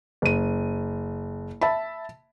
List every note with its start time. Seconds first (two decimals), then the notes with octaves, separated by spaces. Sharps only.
0.22 F#1 D#7
1.61 E5 A5 B5